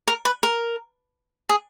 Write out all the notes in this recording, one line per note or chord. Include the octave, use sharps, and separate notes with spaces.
A#4
B4
A#4
G#4